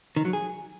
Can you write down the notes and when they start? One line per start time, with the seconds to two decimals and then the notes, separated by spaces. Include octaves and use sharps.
0.16 D#3
0.25 F#3
0.33 G#4